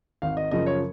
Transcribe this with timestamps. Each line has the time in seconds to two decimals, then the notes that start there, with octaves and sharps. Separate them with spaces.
0.22 G#1 F5
0.37 D#5
0.51 F#2 C#3 F3 D#5
0.66 C#5